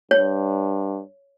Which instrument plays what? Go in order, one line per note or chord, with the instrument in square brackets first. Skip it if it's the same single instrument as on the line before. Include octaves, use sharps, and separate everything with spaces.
[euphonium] G2 [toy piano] C#5